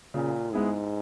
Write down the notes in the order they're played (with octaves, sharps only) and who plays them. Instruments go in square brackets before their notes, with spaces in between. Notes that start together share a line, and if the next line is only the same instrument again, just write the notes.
[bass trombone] A#2 [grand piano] C#3
[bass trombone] G#2 [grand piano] G#3 B3 E4 G#4